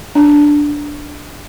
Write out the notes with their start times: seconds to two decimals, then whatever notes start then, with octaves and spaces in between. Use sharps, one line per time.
0.15 D4